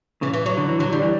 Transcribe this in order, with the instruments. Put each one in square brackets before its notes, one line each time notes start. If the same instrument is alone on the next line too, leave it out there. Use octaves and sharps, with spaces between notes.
[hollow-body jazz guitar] C#3 [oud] E3
[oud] E3
F#3
[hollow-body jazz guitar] D3
E3
[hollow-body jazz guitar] D3 [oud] F#3
[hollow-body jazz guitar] D3 [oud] G3
[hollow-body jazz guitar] E3